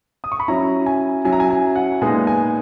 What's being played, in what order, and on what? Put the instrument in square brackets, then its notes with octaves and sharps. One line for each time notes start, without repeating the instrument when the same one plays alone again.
[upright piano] D#6
C#6
B5
F#3 C#4 E4 A#5
G#5
F#3 C#4 E4 G#5
A#5
G#5
G#5
F#5
A#2 G#3 B3 D#4 G#5
G#5